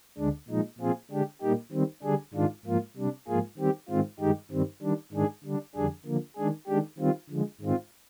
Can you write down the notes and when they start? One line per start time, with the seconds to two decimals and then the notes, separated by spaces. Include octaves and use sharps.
0.18 D2 D3 G#3 D4
0.49 A#2 F3 G#3 D#4
0.79 A#2 F3 C4 F4 G#4
1.11 D3 G#3 D4 G4
1.42 A#2 G3 A#3 D#4 G4
1.72 D#3 G3 C4
2.03 D3 G3 D4 G#4
2.34 G#2 D#3 G#3 D4 F4
2.66 G#2 F3 A#3 F4
2.97 C3 G3 D4
3.28 G#2 F3 A#3 F4 G#4
3.58 D#3 G3 C4 G4
3.88 G#2 D#3 G#3 C4 F4
4.20 G2 D#3 G#3 D#4 G4
4.51 G2 D#3 G3 C4
4.82 D#3 G3 D4
5.13 G#2 D#3 G#3 D4 G#4
5.44 D3 G3 D4
5.75 F2 D3 G3 D4 G#4
6.06 D3 F3 A#3
6.36 D#3 G#3 D4 G#4
6.67 D#3 G#3 D4 G4
6.98 D#3 G3 C4 F4
7.30 D3 F3 G#3
7.61 G#2 D#3 G#3 C4 F4